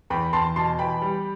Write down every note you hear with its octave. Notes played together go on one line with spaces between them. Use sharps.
E2 G5 B5
E2 A5 C6
B2 A5 C6
E3 G5 B5
G3